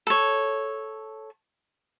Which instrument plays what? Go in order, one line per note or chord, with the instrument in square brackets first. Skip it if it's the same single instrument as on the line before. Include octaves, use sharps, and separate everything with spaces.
[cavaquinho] A4 C#5